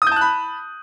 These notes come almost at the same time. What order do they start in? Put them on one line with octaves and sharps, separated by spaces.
D#6 G6 A5 F#6 B5